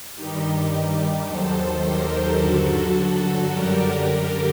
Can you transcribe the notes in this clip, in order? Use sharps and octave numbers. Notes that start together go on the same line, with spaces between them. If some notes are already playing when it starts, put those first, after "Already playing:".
G2 D#3 G3 D#4 G4
D#2 D#3 F#3 A4 C5
G4 A#4
G2 D3 F#3 F#4 A4
F#4 A4
F#2 D3 G3 G4 A#4